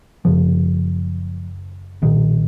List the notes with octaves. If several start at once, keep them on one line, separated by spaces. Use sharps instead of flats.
F#1 F#2 C#3 F3
B1 A#2 D#3